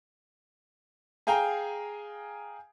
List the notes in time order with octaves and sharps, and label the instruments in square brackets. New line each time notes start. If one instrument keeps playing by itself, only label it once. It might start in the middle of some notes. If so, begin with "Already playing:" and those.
[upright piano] G#4 F5 G5 G#5 A#5